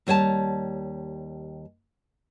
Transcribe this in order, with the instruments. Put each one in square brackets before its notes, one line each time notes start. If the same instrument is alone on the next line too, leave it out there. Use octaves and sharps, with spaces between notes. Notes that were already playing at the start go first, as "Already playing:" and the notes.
[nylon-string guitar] D#2 G3 C#5 F#5 A5